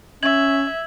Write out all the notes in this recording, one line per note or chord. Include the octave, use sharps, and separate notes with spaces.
C#4 E5 G#6 F#7